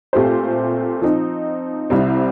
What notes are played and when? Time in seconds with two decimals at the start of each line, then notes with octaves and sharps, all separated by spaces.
0.13 A#2 A3 C4 G4 C5
1.02 F3 C4 D#4
1.90 C2 C3 G3 C4